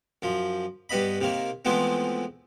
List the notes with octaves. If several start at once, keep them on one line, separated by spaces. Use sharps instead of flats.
F#2 F3
G2 G3 B3 D#5 B5
C3 D#3 A#3
E3 F3 G#3 A3 B3 C4